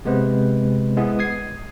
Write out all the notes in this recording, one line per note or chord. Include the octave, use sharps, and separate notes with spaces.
C3 G#3 B3 B4 C5
G#3 B3 E4 G#4
D#6 G#6 C7